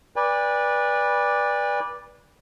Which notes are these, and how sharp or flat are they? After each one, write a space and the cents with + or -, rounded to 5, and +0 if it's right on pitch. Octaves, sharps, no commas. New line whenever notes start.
B4 -20 D5 +0 G#5 -45